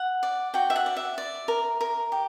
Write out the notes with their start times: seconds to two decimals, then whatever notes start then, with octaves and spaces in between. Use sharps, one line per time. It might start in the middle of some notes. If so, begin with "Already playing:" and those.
Already playing: F#5
0.23 D5
0.54 F#4 G5
0.70 E5
0.76 F#5
0.86 D5
0.97 E5
1.18 D5
1.48 A#4
1.81 A#4
2.12 G4